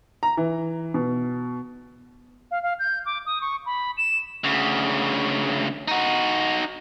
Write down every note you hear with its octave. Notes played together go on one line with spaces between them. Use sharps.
A#5
E3
B2
F5
F5
G6
D6
D#6
C#6
B5
E7
D2 C#3
D#4 F#4